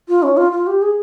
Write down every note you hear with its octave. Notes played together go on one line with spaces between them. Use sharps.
F4
C#4
F4
F4
G4
G#4